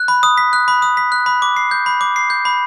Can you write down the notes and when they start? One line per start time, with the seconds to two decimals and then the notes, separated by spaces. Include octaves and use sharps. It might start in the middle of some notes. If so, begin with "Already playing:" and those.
Already playing: F#6
0.08 B5
0.23 D#6
0.38 B6
0.53 F#6
0.68 B5
0.82 D#6
0.97 B6
1.12 F#6
1.26 B5
1.42 D6
1.56 C7
1.71 G6
1.86 B5
2.01 D6
2.16 C7
2.30 G6
2.45 B5